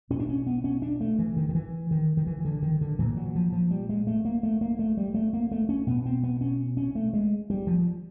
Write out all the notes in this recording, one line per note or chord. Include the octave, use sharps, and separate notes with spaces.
B2 C#4
D4
C#4
B3
C#4
D4
A3
E3
D#3
D#3
E3
D#3
D#3
E3
D3
D#3
D3
A#2 E3
F#3
F3
F3
G3
G#3
A3
A#3
A3
A#3
A3
G3
A3
A#3
A3
C#4
B2 B3
C4
B3
C#4
C#4
A3
G#3
G3
F3